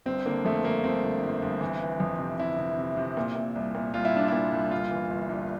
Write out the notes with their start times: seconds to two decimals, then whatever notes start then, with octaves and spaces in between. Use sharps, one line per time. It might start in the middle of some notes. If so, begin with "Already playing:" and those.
0.06 G1 C4
0.26 D3 A#3
0.45 F2 A3
0.64 G1 A#3
0.84 G1 C4
1.03 G1
1.23 G1
1.42 G1
1.61 E3
1.81 E3
2.00 F2
2.19 C3
2.39 C3 E4
2.59 C3
2.77 C3
2.97 C3
3.17 A#2
3.36 A#2
3.55 C2
3.75 A#2
3.94 C2 F4
4.05 E4
4.14 C2 D4
4.28 A#2 E4
4.52 C2
4.71 G1 F4
4.91 E3
5.11 G1
5.29 G2